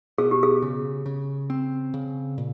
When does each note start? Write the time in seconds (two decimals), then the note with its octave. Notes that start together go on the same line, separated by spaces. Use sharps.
0.18 B2 G#4
0.31 G4
0.43 G#4
0.62 C#3
1.06 C#3
1.50 C4
1.94 C#3
2.38 A#2